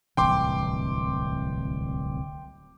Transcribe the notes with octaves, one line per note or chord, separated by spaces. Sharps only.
D1 C2 E3 G5 C6 D6